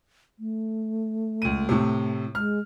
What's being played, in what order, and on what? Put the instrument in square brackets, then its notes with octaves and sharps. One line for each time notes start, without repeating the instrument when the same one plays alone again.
[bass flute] A3
[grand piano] C#2 D#7
A2 C3
[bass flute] G#3 [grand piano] F6